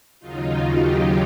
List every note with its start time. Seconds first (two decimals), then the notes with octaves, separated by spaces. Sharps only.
0.20 D#2 C#3 F#3 D#4 F4
0.66 F4 G4